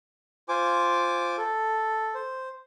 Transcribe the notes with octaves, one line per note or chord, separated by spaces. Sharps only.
F4 C5 G#5 D6
A4
C5